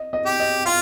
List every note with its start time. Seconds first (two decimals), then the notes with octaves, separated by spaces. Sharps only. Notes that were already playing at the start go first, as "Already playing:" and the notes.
Already playing: D#5
0.13 D#5
0.26 G4
0.40 D#5
0.66 F4 F5